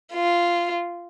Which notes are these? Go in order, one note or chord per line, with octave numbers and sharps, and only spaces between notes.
F4